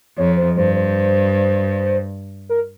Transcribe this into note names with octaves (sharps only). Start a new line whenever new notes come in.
F2 C#5
C5
G2 C5
C5
A#4